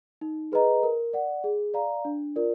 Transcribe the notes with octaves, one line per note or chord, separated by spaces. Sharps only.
D#4
G#4 B4 D#5 A#5
A#4
D5 F#5
G#4
D5 F5 A#5
D4
F4 A#4 D5